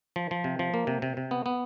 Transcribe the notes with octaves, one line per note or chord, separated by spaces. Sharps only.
F3
F3
C3
F3
A#3
C3
C3
C3
B3
B3